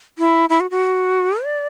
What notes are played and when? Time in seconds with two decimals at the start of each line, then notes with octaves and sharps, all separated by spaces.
0.18 E4
0.50 E4
0.60 F#4
0.71 F#4
1.43 D5